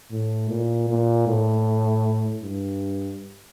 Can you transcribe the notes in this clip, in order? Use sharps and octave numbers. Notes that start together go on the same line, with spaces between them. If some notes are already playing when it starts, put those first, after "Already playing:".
A2
A#2
A#2
A2
G2